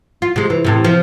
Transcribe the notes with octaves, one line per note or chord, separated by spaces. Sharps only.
F4
C3 G#3
E3
E2 A2 C3
F3